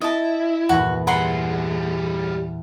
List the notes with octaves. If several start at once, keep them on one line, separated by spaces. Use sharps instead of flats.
E4 D#5 A5
E2 G2 A#2 F#4
G3 G#4 F#5 B5 C6